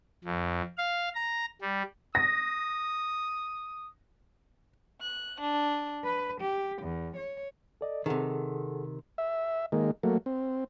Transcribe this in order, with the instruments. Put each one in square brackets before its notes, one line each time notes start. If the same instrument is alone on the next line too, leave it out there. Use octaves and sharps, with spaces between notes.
[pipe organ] F2
F5
A#5
G3
[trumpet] D#6 [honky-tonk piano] A#6
[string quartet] F#6
D4
B4
G4
E2
C#5
[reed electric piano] A4 D5 D#5
[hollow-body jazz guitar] C3 D#3 [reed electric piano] G#4 A4 F#5
[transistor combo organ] E5
D#3 G#3 A#3
F#3 A3 A#3
C4